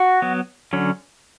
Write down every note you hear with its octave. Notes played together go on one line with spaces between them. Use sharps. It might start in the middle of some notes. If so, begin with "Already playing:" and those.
Already playing: F#4
F#3 B3
D3 F#3 C#4